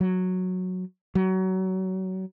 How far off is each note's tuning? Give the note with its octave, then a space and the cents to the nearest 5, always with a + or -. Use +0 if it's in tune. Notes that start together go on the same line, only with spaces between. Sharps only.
F#3 -10
F#3 +25